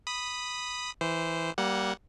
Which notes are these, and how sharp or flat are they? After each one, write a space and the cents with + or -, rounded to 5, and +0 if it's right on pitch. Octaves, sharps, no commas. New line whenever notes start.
B5 +0 D#6 -5
E3 -5 C5 -15
G3 -20 A#3 +15 F#5 +0